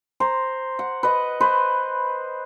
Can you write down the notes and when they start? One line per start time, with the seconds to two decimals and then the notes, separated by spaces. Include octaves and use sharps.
0.20 C5 A#5
0.79 F#5
1.03 B4 D#5
1.40 B4 C5